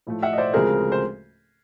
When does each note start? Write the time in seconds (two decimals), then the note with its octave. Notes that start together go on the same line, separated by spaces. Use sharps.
0.07 A2 F3 A3
0.22 E5 F#5
0.33 D#5
0.38 C5 D5
0.53 D2 C#3 F3 G#3 C4 G#4 A#4
0.92 C5